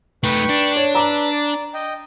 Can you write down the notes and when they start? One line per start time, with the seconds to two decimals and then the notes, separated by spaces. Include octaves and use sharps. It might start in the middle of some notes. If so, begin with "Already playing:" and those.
0.24 A3 D#4 B4 G5 C#6
0.49 D4
0.76 C#5
0.95 B4 A#5 D6 E6
1.30 D5
1.74 D#5 G5